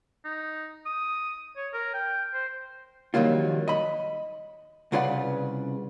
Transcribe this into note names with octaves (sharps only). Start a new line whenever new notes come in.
D#4
D#6
C#5
A#4
G5
C5
F2 D#3 F#3 G3 A#3 F4
D#5 B5
C2 C#3 F4 B4 D5 F#5